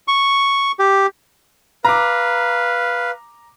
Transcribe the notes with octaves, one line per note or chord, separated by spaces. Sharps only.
C#6
G4
B4 F5 A#5 D6